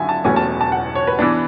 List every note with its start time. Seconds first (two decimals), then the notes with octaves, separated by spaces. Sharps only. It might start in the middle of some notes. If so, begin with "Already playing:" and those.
Already playing: G#1 F#2 D3 E5 G#5
0.09 A5
0.24 E1 E2 B2 A3 C#4 G#5
0.36 A5
0.61 A5
0.72 F#5
0.95 C#5
1.07 B4
1.19 E3 B3 D4